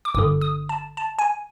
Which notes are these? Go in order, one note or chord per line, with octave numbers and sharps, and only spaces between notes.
D6
G1 G2 D3 D#6
D#6
A5
A5
G#5